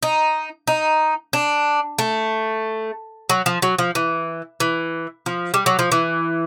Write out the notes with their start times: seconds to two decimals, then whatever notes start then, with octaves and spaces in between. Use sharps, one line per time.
0.03 D#4
0.68 D#4
1.33 D4
1.98 A3
3.29 F#3
3.46 F3
3.62 F#3
3.79 F3
3.95 E3
4.60 E3
5.26 F3
5.54 G3
5.66 F#3
5.79 F3
5.92 E3